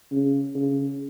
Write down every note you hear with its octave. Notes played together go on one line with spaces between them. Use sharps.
C#3
C#3